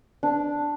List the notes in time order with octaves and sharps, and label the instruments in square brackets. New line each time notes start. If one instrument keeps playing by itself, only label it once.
[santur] D4